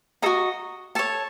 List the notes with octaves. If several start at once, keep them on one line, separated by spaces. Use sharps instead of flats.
F#4 A4 D#5 A#5
A4 C#5 A5